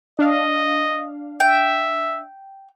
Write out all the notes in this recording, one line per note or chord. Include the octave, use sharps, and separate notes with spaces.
D4 D#5 F5
E5 G5